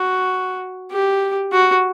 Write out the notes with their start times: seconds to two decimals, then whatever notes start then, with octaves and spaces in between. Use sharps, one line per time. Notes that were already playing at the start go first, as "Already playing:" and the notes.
Already playing: F#4
0.92 G4
1.52 F#4